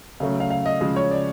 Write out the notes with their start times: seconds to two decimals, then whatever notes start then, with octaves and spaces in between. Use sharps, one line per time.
0.20 C#3 F#3 A3 C#4 F5
0.40 F5
0.50 F5
0.66 D#5
0.81 C#3 F3 G#3
0.96 C#5
1.11 D5